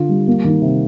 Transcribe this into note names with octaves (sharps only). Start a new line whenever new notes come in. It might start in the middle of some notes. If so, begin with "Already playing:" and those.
Already playing: D3 F4
G3
A#3
D#3
C3